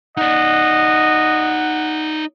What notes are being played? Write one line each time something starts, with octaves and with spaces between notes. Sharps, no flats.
D#4 D5 D#5 F#5